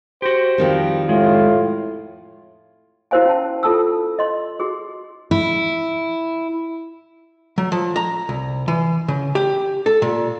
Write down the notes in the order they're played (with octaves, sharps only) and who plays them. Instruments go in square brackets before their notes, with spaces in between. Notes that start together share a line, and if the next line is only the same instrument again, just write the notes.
[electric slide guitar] F#4 G4 [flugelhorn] C5
[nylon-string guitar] F2 D#3 G3
[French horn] A2 [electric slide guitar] G#3 [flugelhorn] F4
[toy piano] E4 F#4 A#4 C5 F5 G#5
C#4 A5
F4 A4 A5 E6
D#5 C6
F#4 G#4
[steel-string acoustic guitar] E4
[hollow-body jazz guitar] F#3
F3
A#5
C2
E3
C#3
G4
A4
A#2